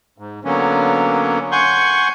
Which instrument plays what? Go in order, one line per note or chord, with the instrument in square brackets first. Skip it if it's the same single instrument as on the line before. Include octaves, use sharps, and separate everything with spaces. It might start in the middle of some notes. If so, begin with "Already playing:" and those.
[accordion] G#2
D3 F#3 A#3 B3 C#4
F#5 G#5 C6 C#6 G6